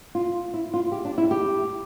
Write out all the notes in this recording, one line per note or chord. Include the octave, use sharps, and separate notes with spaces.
F4
E4
F4
G4
D4
E4
G4